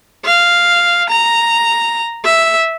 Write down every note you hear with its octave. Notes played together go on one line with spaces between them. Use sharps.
F5
A#5
E5